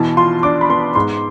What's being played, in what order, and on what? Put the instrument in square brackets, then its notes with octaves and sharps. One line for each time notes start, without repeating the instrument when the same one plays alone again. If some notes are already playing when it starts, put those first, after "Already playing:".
Already playing: [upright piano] B2 E3 [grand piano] A5
[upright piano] F4 [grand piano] C6
[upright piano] D4 [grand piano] D6
[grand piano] B5
[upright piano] B3 [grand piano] C6
[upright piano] G#2 [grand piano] C6